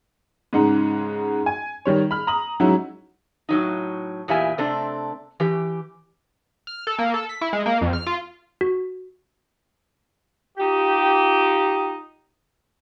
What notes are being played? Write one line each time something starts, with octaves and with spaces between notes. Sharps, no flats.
G#2 C#3 G#3 D#4 F#5
G#5
D#3 G3 C#5
B5 F6
A#5 D#6 F#7
F#3 G#3 C#4 D#4 E4 F#4
A2 F#3 D#4
E2 A#2 E4 G4 E5 G#5
C3 A3 C4 D4 A4
E3 G4
F6
A4
A#3
A4
B6
E4
G#3
A#3
F2
F6
F4
F#4
D#4 F4 G4